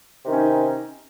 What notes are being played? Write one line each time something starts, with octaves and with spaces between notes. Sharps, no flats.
C3 D#3 C#4 D#4